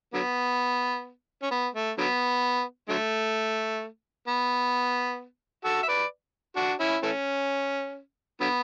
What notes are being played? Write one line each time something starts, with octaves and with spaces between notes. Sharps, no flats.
D3 F#3 B3
C#4
B3
A3
D3 F#3 B3
D3 F#3 A3
B3
F#4 A4
E5
B4 D5
D4 F#4
C#4 E4
E3 A3 C#4
D3 F#3 B3